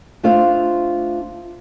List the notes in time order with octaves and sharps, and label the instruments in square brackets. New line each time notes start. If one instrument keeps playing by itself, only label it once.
[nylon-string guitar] A3 D4 F4 A4 C5 F5